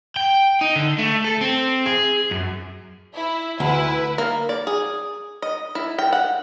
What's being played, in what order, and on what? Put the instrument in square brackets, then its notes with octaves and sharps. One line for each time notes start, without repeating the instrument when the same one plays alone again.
[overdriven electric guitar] G5
D#4
D3
A3
A4
C4
G#4
F#2
[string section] E4
[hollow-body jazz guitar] D2 [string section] E4 B4
[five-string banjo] A#3
D5
G#4
D#5
E4
G5
F#5